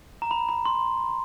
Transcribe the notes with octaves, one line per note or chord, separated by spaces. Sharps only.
A#5
B5
B5
C6